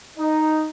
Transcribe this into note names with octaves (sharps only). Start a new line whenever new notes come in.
D#4